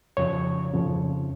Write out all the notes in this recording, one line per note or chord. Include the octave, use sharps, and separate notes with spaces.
F2 C#3 F3 C#5
F2 C#3 F3